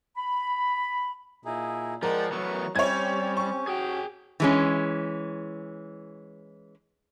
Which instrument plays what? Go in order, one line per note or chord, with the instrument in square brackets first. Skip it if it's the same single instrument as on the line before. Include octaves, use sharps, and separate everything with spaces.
[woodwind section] B5
[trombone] A#2 [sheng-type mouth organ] D#4 E4 G#4
[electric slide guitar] F3 [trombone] G#3 [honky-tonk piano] A#4 [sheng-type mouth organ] D5 F#5 G5
[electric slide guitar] E3 A3 B3 [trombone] F#3 [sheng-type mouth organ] C#6
[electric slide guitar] G3 [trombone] C4 [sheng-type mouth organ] C#4 G4 [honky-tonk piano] C#5 G#6
[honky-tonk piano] C#6
[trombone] F#4 [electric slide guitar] G#4 G5
[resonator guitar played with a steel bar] E3 G#3 C#4